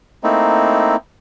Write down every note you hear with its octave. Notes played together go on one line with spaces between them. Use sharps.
A3 A#3 C4 D#4 E4